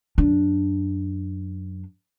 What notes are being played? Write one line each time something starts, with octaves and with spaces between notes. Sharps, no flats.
F#2 D4